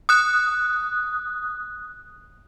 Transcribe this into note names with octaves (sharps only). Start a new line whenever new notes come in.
D#6 F#6